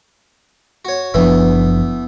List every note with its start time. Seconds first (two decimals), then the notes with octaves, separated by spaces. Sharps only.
0.85 F#4 C#5
1.14 F#1 E3 F3 A3 B3 D4